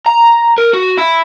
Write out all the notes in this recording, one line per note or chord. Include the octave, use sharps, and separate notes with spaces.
A#5
A#4
F#4
E4